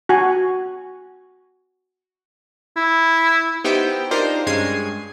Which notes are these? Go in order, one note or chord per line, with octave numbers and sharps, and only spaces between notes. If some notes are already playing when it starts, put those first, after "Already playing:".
F#4 G#5
E4
B3 D#4 E4 G4 C5 G5
D4 D#4 F4 G4 A#4 C5
G2 G#3 C#4 G#6 C7 D#7